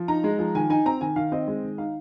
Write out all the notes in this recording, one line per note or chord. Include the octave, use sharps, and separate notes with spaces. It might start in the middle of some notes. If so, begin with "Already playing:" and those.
Already playing: F3
D#4 A#5
G#3
F3
D#3 G#5
D#4 G#5
C4 A#5
D#3 G#5
D#3 F5
C4 D#5
G#3
D#3
D#4 F5